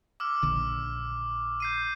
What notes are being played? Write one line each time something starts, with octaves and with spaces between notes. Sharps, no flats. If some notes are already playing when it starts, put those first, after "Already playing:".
D6 E6 F6
A#1 D3
G6 C7 D#7